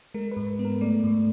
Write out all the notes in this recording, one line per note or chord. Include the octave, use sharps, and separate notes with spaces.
G#3 A#4
B4
G#2
B3
A#4
A3 D5
G#2